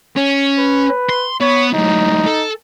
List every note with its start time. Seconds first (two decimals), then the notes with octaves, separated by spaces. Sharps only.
0.17 C#4
0.58 B4
1.09 C6
1.41 B3 C#5
1.73 F#2 A2 D#4
2.26 A4